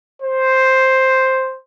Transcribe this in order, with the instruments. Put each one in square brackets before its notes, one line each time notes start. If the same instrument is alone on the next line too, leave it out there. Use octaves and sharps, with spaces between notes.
[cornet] C5